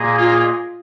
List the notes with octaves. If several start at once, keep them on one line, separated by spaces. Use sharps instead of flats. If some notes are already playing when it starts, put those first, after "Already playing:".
Already playing: A#2 A#3 G#4 D#5
F4